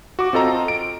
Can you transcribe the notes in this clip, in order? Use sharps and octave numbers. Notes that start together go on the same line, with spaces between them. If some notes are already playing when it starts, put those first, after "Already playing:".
F#4 D6
C4 F4 A4 D#5 A#5
D7